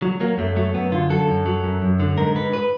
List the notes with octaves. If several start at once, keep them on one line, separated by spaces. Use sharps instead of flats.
F#3
F#3 A#3
F#2 A3
F#3 A3
F#2 B3
D3 F4
F#3 A4
F#2
F#3
F#2
F#2
D3
G#2 A#4
G#2 B4
B4